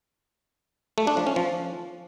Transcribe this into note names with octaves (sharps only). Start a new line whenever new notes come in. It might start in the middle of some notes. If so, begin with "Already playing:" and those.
A3
D4
F3
C#4
F3